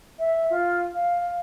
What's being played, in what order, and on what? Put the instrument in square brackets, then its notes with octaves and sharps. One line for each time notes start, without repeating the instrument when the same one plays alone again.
[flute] E5
F4
F5